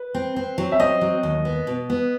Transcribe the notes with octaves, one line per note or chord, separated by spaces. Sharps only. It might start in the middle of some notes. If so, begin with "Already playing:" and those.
Already playing: B4
C4
C4
F#3
E5
C4 D#5
F#3
D#2
B3
B2
B3